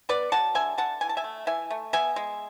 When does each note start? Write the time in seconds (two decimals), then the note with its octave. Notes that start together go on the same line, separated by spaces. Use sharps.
0.09 B3 B4 D5
0.32 F#3 F#5 A5
0.55 D3 E5 G#5
0.78 D3 F#5 A5
1.01 E3 G#5
1.09 A5
1.17 E5 G#5
1.24 A3
1.47 E3 E5 G#5
1.70 A3
1.93 B3 E5 G#5
2.16 G#3